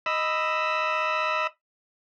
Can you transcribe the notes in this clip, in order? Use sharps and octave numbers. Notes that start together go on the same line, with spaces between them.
D#5 B5 E6